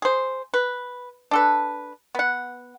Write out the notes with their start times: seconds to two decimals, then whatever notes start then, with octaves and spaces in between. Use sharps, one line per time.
0.02 G#4 C5
0.54 B4
1.31 D4 A4 B4
2.15 B3 F#5